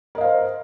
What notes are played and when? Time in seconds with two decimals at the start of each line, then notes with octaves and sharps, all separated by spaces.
0.15 A#4
0.18 D#5
0.21 F5
0.24 C5